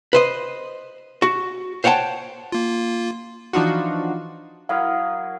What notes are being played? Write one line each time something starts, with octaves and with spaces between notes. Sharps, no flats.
B4 C5 D#5
F#4
C5 C#5 F#5 G5 A5
A#3 F4
E3 F3 D4 D#4 F4 F#4
F#3 E4 A#4 F5 D#6 F6